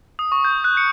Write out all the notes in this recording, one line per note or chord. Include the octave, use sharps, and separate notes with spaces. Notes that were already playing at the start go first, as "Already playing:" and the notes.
D#6
C#6
G6
F#6
C#7